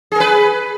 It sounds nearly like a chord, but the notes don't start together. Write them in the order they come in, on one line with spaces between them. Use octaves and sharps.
G#4 A#4 B4